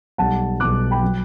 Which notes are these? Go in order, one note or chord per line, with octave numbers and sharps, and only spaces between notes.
B1 B2 G3 F#5 A5
B1 B2 G3 D6 F#6
G5 B5
F#3